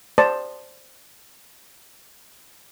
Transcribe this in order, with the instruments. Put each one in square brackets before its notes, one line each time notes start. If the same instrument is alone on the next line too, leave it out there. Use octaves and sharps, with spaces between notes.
[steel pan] C5 D5 A5